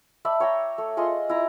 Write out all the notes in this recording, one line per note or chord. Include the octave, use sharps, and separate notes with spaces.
D5 E5 A5 B5
C#5 G5 A#5
A3
F4 G#4 D#5 C6
E4 A#5